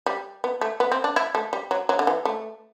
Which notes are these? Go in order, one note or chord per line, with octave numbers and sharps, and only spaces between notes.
G3
B3
A3
B3
C4
D4
E4
A3
G3
F#3
F#3
D3
E3
A3